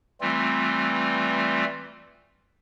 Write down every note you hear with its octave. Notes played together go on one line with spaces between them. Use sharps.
E3 G3 A3 C4 F4